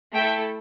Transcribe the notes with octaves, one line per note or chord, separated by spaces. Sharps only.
A3 E4 A4 E5 G5